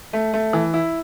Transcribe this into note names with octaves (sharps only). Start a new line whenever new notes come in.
A3
A3
E3
E4